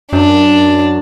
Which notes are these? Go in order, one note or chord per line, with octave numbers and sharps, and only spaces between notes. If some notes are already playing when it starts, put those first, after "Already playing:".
F#2 D4